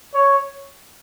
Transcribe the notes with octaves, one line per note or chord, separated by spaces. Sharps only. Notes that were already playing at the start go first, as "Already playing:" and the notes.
C#5